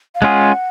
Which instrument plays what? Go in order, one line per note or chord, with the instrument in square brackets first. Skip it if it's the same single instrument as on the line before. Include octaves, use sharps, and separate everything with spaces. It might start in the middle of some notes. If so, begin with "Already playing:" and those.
[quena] F5
[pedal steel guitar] G#3 C#4 F4 G#4 [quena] F#5